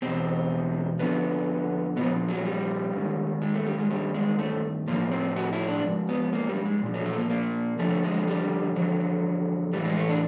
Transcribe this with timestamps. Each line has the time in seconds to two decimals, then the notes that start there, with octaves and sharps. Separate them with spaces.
0.02 E2 B2 C4
0.99 F2 D3 F3 B3
1.96 A#2 F3 B3
2.29 F#3
2.45 G3
2.93 G#2 D#3
3.42 G#3
3.54 A3
3.66 G3
3.78 G#3
3.90 G2 D#3 G3
4.14 G#3
4.39 A3
4.87 A2 F3 A#3
5.12 C4
5.36 F#4
5.52 E4
5.68 D4
5.84 G#2 F3
6.09 B3
6.33 A#3
6.49 G3
6.65 G#3
6.82 A#2 F3
6.94 F#3
7.06 A3
7.18 A#3
7.30 A#3
7.79 F2 D3 F3 A3
8.03 G#3
8.27 G3
8.76 F2 D3 F3 F#3
9.73 A2 E3 G3
9.85 G#3
9.97 A3
10.09 D4